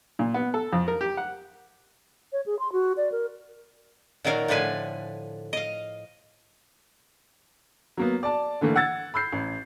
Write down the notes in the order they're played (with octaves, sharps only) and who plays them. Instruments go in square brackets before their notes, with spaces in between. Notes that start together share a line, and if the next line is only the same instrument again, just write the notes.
[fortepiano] A#2
B3
A4
F2
A#4
G4
F#5
[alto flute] C#5
G#4
C6
F#4
D5
A#4
[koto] A#2 D#3 F#3 A#4 F5
A2 D3 F3 B4 G#5
D#5 F5
[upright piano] F#3 A#3 B3
D5 A5
D3 E3 A3 A#3
F#5 E6 G#6 A6
B5 E6 G6 C7
A1